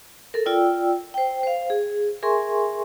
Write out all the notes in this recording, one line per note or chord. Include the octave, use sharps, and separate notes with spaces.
A4 A#4
F4 D5 G5 E6
C5 G5
C5 F5
G#4
G#4 A#4 E5 G#5 C6 C#6